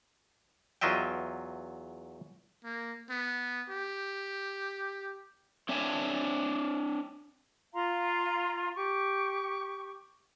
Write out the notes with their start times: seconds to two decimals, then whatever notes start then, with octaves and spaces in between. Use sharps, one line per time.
0.81 E2 F#3 F4 D#5 E5 G5
2.64 A#3
3.10 B3
3.70 G4
5.69 C4 D4 C#5 E5 G#5 A5
7.74 F4 F5 A#5 C6
8.76 G4 C#6